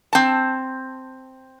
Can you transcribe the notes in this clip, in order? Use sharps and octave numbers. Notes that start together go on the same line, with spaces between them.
C4 A5